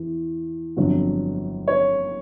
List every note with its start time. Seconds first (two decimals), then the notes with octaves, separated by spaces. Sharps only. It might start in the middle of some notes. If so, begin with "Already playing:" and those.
Already playing: E2
0.77 G1 F2 D3 F#3
1.68 C#5